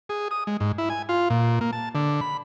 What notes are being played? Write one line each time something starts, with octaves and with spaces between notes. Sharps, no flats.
G#4
D#6
G#3
G#2
E4
G#5
F4
A#2
A#3
A5
D3
B5